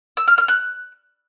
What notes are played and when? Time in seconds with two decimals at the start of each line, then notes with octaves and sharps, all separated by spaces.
0.17 E6
0.28 F6
0.38 F6
0.48 F#6